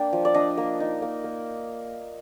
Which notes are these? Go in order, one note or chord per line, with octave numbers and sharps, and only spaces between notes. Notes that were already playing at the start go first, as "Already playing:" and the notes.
Already playing: A#3 D4 G5
F3
D5
D4 D#5
A#3
D#4
A#3
A#3